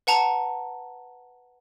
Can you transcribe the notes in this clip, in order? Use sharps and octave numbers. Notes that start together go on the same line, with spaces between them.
B4 F#5 A5 A#5